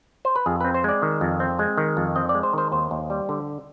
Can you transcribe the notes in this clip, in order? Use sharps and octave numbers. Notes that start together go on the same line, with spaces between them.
C5
B4
F2 G#4
C4 B4
C5
G#3 D5
D#3
F2
C4
G#3
D#3
F2
C4 D#5
D5
G#3
C5
D#3 C5
D#2 C5
D#2
G3
D3